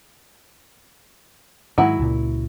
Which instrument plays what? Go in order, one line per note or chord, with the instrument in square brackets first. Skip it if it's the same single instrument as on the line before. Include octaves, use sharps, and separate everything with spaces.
[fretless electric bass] G#2 D#3 G#3 [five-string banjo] F#3 E4 B5
[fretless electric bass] C#2 A#2